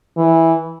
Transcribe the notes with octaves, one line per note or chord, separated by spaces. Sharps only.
E3